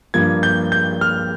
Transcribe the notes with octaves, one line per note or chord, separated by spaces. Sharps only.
G2 F3 A#3 G#6
G6
G6
F6